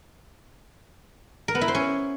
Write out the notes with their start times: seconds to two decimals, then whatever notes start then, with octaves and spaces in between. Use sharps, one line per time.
1.48 A#4
1.55 B3
1.61 E4
1.68 C5
1.75 C#4